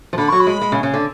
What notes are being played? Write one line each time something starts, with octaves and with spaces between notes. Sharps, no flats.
F3
D3 B5
F#3 C#6
B5
G#3
G#3
C#3
C#3
D3